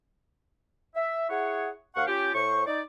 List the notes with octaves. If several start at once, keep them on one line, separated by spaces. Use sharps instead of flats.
E5
E4 G#4 C#5 F#5
D#2 F5 F#5 C#6
C#4 F4 G4
A2 C5 C#6
D#4 D5